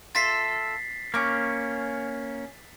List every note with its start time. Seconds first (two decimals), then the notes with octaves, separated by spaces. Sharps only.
0.15 F4 A4 E5 A6 B6 C7
1.14 A#3 C#4 C#6 D6